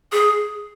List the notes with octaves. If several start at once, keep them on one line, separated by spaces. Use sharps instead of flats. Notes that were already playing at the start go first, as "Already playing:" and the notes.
G#4